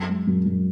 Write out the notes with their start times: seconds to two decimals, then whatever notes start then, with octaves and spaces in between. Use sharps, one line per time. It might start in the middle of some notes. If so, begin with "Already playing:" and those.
Already playing: F#2
0.08 G#3
0.27 F#2
0.46 F#2